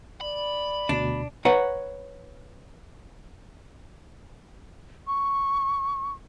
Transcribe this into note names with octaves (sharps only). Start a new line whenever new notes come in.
D5 B5
D2 B2 D4
B4 C#5 F#5 A#5
C#6